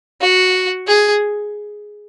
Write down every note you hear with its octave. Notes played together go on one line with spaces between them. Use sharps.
F#4
G#4